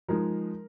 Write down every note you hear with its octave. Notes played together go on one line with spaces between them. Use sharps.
F3 G#3 D#4 A#4